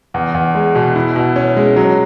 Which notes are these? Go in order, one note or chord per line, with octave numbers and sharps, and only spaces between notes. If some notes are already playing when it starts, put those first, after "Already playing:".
E2
E2
G#3
B2
E4
B2
C#4
G#3
F#3